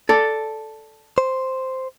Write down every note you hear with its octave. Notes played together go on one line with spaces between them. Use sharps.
A4 D5
C5